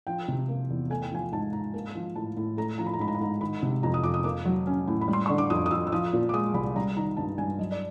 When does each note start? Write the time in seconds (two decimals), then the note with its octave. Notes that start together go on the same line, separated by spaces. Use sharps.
0.07 F3 G5
0.28 C3
0.49 A#3
0.70 E2
0.90 A3 G#5
1.02 G5
1.11 F3 G#5
1.32 G#2 A5
1.53 G#2 A#5
1.74 A#3
1.95 F3
2.16 A2 A5
2.37 A2
2.57 A3 A#5
2.78 F3 A#5
2.86 B5
2.93 A#5
2.99 G#2 B5
3.08 A#5
3.14 B5
3.21 G#2 A#5
3.41 D#3 B5
3.63 C3
3.83 F2 A#5
3.94 D#6
4.04 F2 D6
4.14 D#6
4.24 A#3 D6
4.45 F#3
4.67 C#4
4.88 A2
5.01 B5
5.08 G3
5.13 C6
5.26 D3 C#6
5.38 D6
5.50 F2 D#6
5.66 D#6
5.71 F2 E6
5.87 E6
5.92 F3 D#6
6.13 A#2
6.29 D6
6.33 G#3 D#6
6.54 C2 B5
6.76 G3 A#5
6.97 D#3 A#5
7.17 G2 A5
7.38 G2 G#5
7.59 F#3 D#5
7.72 D5